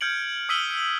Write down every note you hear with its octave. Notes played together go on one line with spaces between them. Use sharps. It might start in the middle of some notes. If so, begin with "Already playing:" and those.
F6 G6 G#6 C#7 D7 F#7
D#6 E6 B6 D#7 F#7 G7